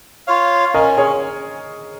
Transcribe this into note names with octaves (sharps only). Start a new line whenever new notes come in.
F4 C#5 F5
C#4 A#4 D#5
G#4 C#5